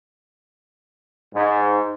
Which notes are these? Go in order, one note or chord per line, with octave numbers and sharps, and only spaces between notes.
G#2